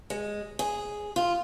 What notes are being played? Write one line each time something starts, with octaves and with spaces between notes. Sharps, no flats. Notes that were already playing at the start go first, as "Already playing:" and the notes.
G#3
G#4
F4